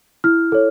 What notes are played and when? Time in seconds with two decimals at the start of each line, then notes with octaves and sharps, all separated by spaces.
0.24 E4 F6
0.52 A4 C#5